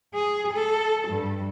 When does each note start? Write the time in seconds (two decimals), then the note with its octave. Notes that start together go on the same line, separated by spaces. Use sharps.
0.14 G#4
0.54 A4
1.09 G2